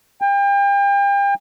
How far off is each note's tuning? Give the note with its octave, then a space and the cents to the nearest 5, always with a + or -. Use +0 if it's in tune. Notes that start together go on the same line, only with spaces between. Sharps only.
G5 +35